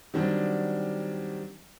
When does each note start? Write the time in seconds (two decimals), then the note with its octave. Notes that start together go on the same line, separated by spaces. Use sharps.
0.14 D#3 F#3 G3 C4 D4